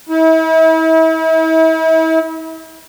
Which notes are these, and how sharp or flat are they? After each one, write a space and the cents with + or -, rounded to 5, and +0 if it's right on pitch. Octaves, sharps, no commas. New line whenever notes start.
E4 -40